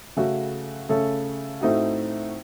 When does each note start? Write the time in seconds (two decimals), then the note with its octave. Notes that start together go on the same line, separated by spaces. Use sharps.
0.17 C#3 A3 C#4 F#4
0.89 C#3 A3 C#4 A4
1.61 A2 A3 C4 D#4 F#4